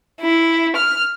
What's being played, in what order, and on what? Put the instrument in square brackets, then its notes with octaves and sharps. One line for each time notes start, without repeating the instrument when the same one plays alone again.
[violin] E4
F6